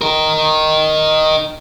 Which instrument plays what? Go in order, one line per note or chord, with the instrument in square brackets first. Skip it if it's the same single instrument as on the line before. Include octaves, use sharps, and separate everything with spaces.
[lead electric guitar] D#4 A#4